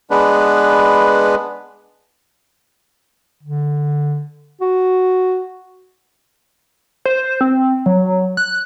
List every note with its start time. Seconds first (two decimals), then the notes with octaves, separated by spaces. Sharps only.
0.10 G#3 B3 D4 B4
3.43 D3
4.61 F#4
7.05 C5
7.41 C4
7.86 F#3
8.37 F#6